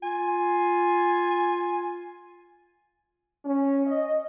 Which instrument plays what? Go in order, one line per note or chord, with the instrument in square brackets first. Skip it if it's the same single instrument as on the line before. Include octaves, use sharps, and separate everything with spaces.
[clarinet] F4 [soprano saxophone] G#5
[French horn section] C#4
D#5